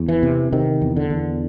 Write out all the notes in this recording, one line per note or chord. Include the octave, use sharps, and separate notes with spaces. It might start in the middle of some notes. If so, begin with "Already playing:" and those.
Already playing: E2
E3
C3
C3 D#3
E2
D3
E2